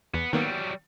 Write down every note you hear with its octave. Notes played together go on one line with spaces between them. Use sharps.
E2 B3
D#3 F#3 G3 A#3 B3